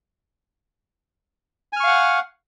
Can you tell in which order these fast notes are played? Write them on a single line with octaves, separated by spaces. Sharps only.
G#5 F6 C#6 F5 F#5